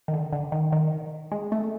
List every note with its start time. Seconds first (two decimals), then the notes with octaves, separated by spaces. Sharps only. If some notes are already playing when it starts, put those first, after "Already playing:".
0.08 D#3
0.13 D3
0.33 D3
0.52 D#3
0.72 D#3
1.32 G#3
1.52 A3